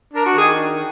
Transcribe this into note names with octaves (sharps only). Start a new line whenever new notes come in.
D4 A#4
F#4
D#3 G#4